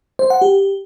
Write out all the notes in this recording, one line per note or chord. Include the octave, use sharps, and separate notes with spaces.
C5
F#5
G4